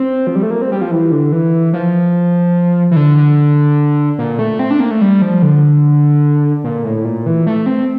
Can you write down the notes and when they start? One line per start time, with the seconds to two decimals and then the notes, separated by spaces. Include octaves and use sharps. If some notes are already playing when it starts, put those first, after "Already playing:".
Already playing: C4
0.27 F3
0.35 G3
0.43 A3
0.50 A#3
0.62 C4
0.72 G3
0.81 F3
0.91 E3
1.12 D3
1.32 E3
1.73 F3
2.91 E3
2.96 D3
3.17 D3
4.19 A#2
4.39 A3
4.59 C4
4.71 D4
4.80 A#3
4.91 A3
5.01 G3
5.22 F3
5.42 D3
6.64 A#2
6.84 A2
7.05 A#2
7.26 E3
7.47 A3
7.66 C4